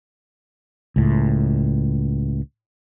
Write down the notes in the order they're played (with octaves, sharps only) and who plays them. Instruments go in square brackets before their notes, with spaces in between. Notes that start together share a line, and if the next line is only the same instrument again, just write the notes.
[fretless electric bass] C#2 A2